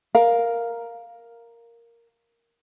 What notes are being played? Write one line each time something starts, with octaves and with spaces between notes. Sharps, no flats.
A#4 F5